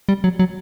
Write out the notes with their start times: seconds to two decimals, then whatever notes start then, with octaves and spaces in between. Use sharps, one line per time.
0.09 G3
0.24 F#3
0.39 F#3